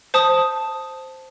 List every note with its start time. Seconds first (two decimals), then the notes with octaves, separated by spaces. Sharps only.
0.14 C5 A5 D#6